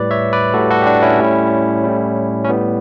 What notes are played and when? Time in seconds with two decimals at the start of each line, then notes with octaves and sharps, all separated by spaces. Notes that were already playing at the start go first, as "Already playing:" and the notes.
Already playing: A2 G3 B4 D5
0.11 C#5 E5
0.33 B4 D5
0.54 A2 G3 F#4 A4
0.70 F#4 A4
0.82 G4
0.86 D4 F#4
1.02 C#4 E4
1.19 A2 G3
1.84 A2 G3
2.45 C#4
2.49 A2 G3 B3